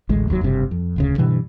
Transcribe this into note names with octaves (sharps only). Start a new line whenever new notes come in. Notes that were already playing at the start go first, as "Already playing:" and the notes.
A1 D2 G#3
F1 D#2 B2 F#3
F#1 G2 C3
F2
D#1 D2 C#3
G2 B2 D3 E3